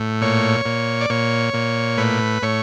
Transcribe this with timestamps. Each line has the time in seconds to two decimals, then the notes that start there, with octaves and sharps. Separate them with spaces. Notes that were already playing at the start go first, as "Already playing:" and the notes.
Already playing: A2
0.22 A#2 C#5
0.66 A#2
1.01 D5
1.10 A#2 C#5
1.54 A#2
1.98 A2 B4
2.42 A2 C#5